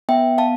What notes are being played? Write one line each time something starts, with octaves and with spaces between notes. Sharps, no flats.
B3 E5 G5
F5 A5